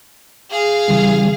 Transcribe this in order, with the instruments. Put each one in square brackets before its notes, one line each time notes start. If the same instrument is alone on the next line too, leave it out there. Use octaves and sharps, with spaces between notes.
[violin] G#4 F5
[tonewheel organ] C#3 E3 G3